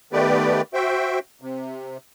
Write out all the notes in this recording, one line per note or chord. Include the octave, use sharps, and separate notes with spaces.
D#3 A3 B3 G4 B4 D5
F#4 C5 E5 G5
C3